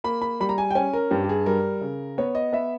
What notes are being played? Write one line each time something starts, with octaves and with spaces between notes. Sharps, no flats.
A#3 B5
B5
G3 B5
A#5
G#5
G5
C#4 G#5
A#4
G2 G4
G4
G#4
G3 A#4
C#3
B3 C#5
D#5
B3 E5